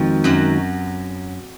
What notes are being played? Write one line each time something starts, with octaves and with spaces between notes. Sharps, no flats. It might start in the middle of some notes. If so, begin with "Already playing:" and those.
Already playing: F2 D#3 F3 G#3 D#4 F#4
F#2 F#3